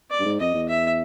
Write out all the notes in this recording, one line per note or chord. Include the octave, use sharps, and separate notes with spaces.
D5
G2
G#2
F2 D#5
E2
E5